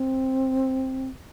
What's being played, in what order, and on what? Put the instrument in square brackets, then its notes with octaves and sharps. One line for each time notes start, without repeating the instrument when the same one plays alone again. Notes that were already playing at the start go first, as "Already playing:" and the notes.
Already playing: [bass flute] C4